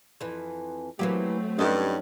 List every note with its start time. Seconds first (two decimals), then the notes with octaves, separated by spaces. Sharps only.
0.21 F2 E3
0.99 E3 F#3 A3 A#3 C4 G4
1.59 G2 C#4 D#4 A4 D#5